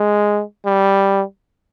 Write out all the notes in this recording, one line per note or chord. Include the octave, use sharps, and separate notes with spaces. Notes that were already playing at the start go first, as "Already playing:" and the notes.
Already playing: G#3
G3